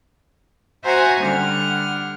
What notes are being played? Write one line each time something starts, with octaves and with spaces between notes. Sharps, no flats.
F#4 C5 E5 F#5 G#5 A#5
D3 G3 F#5 F6